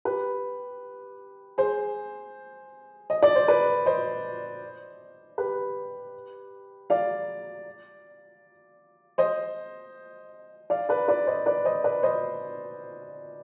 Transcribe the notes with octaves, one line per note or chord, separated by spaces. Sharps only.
G4 B4
G#4 C5
D#5
D5
C5
B4 D5
C5 D#5
G4 B4
D5 F5
C5 D#5
D5 F5
B4 D5
B4 D5
C5 D#5
B4 D5
C5 D#5
B4 D5
C5 D#5